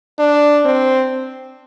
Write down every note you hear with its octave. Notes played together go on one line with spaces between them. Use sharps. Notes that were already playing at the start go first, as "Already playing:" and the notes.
D4
C4